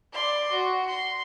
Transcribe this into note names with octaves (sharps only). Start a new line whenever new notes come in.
D5 C6
F#4
C6